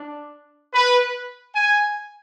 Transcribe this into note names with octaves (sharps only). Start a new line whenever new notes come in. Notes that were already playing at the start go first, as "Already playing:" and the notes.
Already playing: D4
B4
G#5